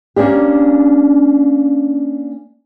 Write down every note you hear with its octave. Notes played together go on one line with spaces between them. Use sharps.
A#3 C#4 D4 G4